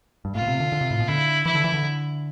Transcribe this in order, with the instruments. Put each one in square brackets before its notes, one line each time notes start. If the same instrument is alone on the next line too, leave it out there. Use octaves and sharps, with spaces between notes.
[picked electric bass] G2
[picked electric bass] A2 [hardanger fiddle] F4
[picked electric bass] B2
C3
D3
D3
C3
A2
B2
[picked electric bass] D3 [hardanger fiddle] E4
[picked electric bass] E3 [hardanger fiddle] E4
[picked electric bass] D3
E3
D3